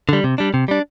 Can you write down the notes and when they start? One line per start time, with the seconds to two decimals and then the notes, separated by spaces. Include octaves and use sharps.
0.09 D3 G3
0.24 C3
0.38 G3 D4
0.54 C3
0.68 G3 D4